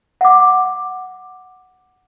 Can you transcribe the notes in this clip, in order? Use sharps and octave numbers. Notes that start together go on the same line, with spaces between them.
F#5 D6